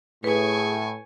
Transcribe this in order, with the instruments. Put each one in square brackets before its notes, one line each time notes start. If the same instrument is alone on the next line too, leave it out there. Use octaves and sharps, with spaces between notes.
[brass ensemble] A2 [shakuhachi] G#4 [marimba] B4 [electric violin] G#5 C#6